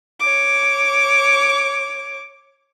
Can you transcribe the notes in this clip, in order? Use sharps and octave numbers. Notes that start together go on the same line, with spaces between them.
C#5 D6